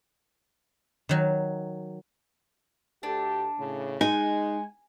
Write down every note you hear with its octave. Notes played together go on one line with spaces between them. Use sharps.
D#3 F#3
D2 D4 G4 A4 A5
A2 C#3
G#3 D#4 F#5 G#5